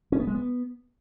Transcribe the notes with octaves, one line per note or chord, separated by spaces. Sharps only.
C#4
B3
G#3
B3